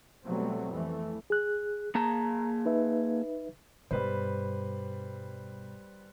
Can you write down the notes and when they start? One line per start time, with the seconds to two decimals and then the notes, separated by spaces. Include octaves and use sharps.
0.24 B2 F#3 G3 A3 B3 C4
0.71 F2 E3 A3
1.30 G#4 F#6
1.95 A#3 G#4 A5 A#5
2.65 D#4 B4 E5
3.91 G2 B2 G3 B4 C5